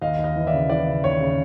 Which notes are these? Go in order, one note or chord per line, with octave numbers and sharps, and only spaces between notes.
D#2 D#5 F5
D#2
D#5 F5
E3
D5 E5
C#3
E3 D5
C#3
D#2 C#5
C#3